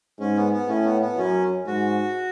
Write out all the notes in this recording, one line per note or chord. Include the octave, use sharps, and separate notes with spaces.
G#2 C#4
B3
B3
A2 C#4
B3
B3
F#2 C#4
G#2 F#4